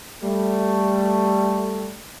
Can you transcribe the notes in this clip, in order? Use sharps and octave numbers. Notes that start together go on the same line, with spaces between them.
G3 A3